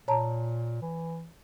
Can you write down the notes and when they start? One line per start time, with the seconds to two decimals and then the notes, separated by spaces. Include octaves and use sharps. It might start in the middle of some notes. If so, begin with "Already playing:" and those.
0.08 A#2 C#5 A5 A#5
0.82 E3